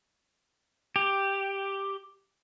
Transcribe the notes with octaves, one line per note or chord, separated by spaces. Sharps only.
G4